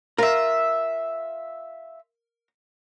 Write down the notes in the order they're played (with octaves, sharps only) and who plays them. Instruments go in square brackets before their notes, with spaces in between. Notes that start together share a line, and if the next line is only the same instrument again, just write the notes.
[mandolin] F4 E5 [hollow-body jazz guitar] A#4